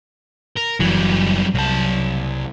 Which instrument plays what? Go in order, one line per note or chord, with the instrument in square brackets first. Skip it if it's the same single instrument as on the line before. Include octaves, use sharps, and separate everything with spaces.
[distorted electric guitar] A#4
[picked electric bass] F#1 E3 [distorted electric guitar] F#3 G3
[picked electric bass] C2 [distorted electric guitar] F#3 A5